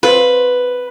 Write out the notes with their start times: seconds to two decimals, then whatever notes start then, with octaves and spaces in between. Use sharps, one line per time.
0.03 C4 F4 B4